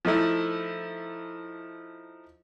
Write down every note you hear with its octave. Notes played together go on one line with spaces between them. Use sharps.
F3 A3 D#4 E4